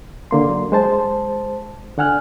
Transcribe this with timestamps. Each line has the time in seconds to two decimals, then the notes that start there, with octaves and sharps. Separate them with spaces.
0.31 D3 A#3 C6
0.49 F#3
0.72 G#3 C5 A5
1.98 D3 F#5 G#5 F6 F#6